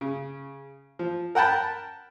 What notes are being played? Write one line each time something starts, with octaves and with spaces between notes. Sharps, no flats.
C#3
F3
A#4 F#5 G5 A5 B5